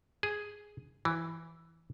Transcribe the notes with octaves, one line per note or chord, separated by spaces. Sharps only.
G#4
E3